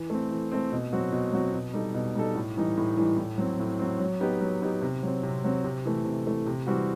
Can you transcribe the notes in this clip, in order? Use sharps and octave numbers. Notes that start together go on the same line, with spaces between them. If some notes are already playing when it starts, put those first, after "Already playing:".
Already playing: E3
A3 C4
E3
A3 C4
B2
F#3 C4 F#4
B2
F#3 C4 F#4
B2
G3 D#4 A4
B2
G3 D#4 A4
A2
E3 G3 D#4
A2
E3 G3 D#4
A2
F#3 C4
A2
F#3 C4
F#3
B3 D#4 G4
F#3
B3 D#4 G4
C3
F#3 C4
C3
F#3 C4
C3
E3 A3
C3
E3 A3
C3
E3 G3 C4 F#4